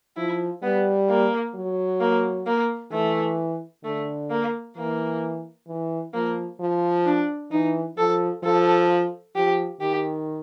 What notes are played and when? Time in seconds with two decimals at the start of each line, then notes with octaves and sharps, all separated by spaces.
0.17 F3 E4
0.62 G3 B3
1.09 A#3
1.55 F#3
2.00 A#3
2.46 A#3
2.92 E3 A3
3.84 D3 A3
4.30 A#3
4.76 E3 A#3
5.67 E3
6.13 F3 A#3
6.60 F3
7.05 D4
7.51 E3 D#4
7.97 F3 A4
8.43 F3 A4
9.35 F3 G4
9.81 D#3 G4